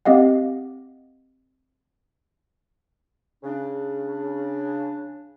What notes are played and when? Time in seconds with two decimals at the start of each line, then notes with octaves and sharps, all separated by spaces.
0.05 C4 G4 D#5 F5 F#5
3.44 C#3 D4